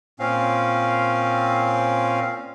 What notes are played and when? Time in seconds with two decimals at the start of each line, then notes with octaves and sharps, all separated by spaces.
0.20 A#2 C4 C#4 F5